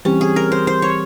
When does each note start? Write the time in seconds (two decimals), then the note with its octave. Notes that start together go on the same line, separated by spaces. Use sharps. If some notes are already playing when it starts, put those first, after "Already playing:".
0.05 E3 G3 C4 C#4 G4
0.21 G#4
0.36 A#4
0.52 C5
0.67 C5
0.82 C#5